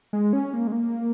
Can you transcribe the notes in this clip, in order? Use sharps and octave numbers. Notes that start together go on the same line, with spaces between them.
G#3
C#4
A#3
G#3
A#3